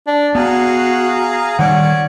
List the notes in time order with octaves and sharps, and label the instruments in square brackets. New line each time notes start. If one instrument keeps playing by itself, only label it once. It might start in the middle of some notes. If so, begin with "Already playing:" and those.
[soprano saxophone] D4
[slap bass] B3 [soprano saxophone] F#4 [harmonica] G#4 F5 A#5
[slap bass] D#3 G3 [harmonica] C#4 C#5 D5 [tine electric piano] F#5